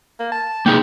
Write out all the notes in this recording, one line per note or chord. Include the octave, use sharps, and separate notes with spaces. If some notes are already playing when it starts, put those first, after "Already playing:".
A#3
A5
A#3 D#4 G#4 G5